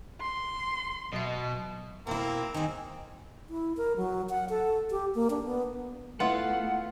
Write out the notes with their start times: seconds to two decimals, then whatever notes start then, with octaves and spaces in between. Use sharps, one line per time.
0.21 C6
1.13 B2 F#3 E5
2.07 B2 A#3 C4 E4
2.54 D#3 C4 C#4 D#4 G#4
3.50 E4
3.77 A#4
3.97 F#3
4.30 F#5
4.49 A4
4.91 G4
5.15 A#3
5.30 D4
5.45 B3
6.20 A3 B3 E4 F4 F#5